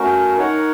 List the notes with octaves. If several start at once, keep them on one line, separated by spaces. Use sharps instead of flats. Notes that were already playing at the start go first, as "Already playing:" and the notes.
Already playing: A3 C#4 F#4 A#4
D#4 A#4 C#5 F#5